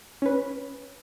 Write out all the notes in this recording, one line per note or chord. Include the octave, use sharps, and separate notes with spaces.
C#4 B4